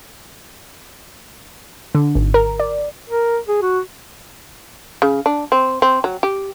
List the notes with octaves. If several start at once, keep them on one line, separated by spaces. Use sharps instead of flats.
D3
G#1
A#4
D5
A#4
G#4
F#4
C#3
D4
C4
C4
F#3
G4